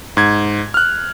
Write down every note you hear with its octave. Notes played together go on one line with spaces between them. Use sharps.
G#2 G#6
F6 F#6